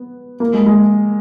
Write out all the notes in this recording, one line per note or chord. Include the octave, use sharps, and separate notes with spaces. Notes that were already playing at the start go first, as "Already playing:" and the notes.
Already playing: B3
A#3
G#3
G#3